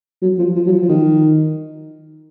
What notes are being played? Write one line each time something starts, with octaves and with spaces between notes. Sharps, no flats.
F#3
F3
F3
F#3
F3
F3
D#3